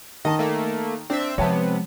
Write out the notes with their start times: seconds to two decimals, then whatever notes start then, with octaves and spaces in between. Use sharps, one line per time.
0.25 D#3 D#5 A5
0.39 A3 A#3
1.10 C4 D4 E5
1.38 C3 F3 G#3 B3 C#5 G5 A5